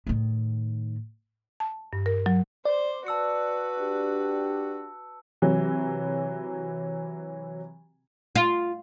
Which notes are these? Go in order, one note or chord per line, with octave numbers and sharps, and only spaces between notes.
A2 D#3
A5
G2
A#4
F#3
C5 D5
F#4 B4 A5 E6 C#7
D4 G4
C3 E3 F#3
F4